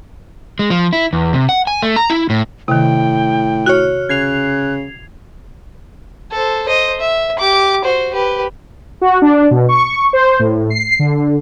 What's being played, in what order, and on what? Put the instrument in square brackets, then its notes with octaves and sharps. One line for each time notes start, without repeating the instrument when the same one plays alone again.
[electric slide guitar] G#3
F3
E4
E2
C3
F#5
G#5
A3
A#5
E4
A2
[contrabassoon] A2 [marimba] C3 D#3 [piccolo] G5
[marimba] F#4 [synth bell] C#5 F6 F#6
[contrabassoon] C#3 [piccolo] F#6 [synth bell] G#6 C7 F7
[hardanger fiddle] A4 C5
C5 D#5
E5
G4 D6
F#4 C5
G4 B4
[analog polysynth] F#4
D4
B2
C#6
C5
A2
C7
D3